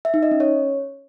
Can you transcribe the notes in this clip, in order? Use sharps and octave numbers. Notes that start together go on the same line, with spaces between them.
E5
D#4
D#5
C#4
C#5